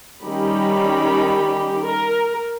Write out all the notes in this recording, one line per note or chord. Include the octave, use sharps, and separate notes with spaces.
D#3 G3 C#4 D#4 G4 B5
A#4